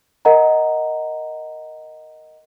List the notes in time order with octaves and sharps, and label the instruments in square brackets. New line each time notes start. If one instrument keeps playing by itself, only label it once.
[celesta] A#4 D#5 F#5 A#5